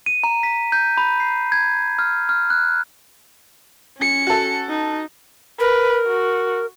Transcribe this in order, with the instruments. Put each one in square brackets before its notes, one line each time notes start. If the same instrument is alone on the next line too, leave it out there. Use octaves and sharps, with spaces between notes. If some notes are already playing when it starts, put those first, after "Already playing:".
[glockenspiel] D#7
A#5
B6
G6
B5
C7
G#6
F6
F6
F#6
[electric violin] C#4 C#7
[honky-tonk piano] F#4 A4
[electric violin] D#4
[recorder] A#4 [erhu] B4
[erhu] F#4